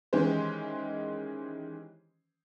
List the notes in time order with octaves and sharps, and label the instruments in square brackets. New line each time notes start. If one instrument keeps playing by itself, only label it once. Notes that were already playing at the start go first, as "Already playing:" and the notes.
[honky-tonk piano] D#3 E3 G#3 C#4 G4 C5